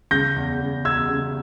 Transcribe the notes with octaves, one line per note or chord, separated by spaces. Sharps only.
C#3 G6 A#6
E2
C#3
E2 E6 G#6
C#3